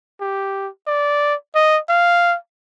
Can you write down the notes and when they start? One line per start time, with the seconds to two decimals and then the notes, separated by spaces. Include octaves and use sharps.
0.21 G4
0.87 D5
1.55 D#5
1.89 F5